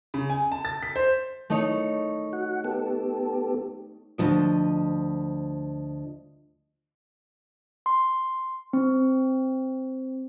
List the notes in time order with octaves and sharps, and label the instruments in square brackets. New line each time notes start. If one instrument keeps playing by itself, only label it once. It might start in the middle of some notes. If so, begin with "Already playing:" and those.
[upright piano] C#3
G#5
A5
A6
B6
C5
[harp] A3 D#4 C#5
[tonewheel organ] F#4 F#5
B3 G4 A4
[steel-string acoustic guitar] D2 F3 D#5
[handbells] C6
C4